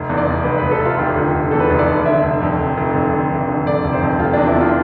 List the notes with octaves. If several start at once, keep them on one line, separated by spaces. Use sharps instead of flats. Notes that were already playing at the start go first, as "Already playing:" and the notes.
Already playing: F1
E2
D5
F1
F1 B4
B4
F1
A4
F1
F4
F1 G4
D3
F1
E2 A4
B4
A4
F1
D5
F1
D3 E5
F1
F2
F1
F1
F2
D3
F1
D3
F2 D5
F1
C5
F2
F1 F4
D4
E2
E4
E2 F4